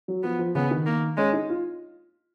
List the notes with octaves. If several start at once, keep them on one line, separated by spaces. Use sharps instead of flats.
F#3
F3 B3
F3
C#3 B3
D#3
A#3
G#3 C#4
D#4
F4